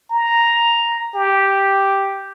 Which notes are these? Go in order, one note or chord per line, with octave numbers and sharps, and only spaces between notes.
A#5
G4